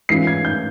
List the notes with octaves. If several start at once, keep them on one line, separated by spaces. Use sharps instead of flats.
G#2 E3 G#3 C#4 F4 C7
G#6
G6